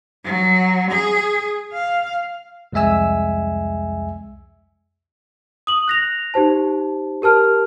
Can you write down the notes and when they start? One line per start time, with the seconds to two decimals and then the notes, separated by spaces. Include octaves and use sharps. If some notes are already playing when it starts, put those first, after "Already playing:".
0.24 F#3
0.92 G#4
1.73 F5
2.73 C2 F2 G#3 E5 G#5 E6
5.67 D#6 F#7
5.88 F#6 A#6 F7
6.34 D#4 G4 C5 A5
7.22 G4 A#4 A5 F6